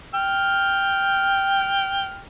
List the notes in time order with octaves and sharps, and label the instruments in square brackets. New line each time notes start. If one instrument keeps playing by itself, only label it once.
[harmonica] G5 F6